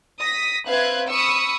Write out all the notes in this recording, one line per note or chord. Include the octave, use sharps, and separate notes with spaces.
D#6 A#6 B6
C4 B4 E5 F5 F#6 G#6
B5 C#6 D#6 E6 C#7